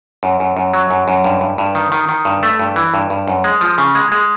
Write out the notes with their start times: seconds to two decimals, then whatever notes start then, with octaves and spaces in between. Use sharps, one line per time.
0.23 F#2
0.40 F#2
0.57 F#2
0.74 F#3
0.91 F#2
1.08 F#2
1.24 G2
1.41 G2
1.58 G2
1.75 D#3
1.92 D#3
2.09 D#3
2.25 G2
2.43 A3
2.60 G2
2.76 E3
2.94 G2
3.10 G2
3.28 F#2
3.44 G#3
3.61 F3
3.78 C#3
3.95 G#3
4.12 G#3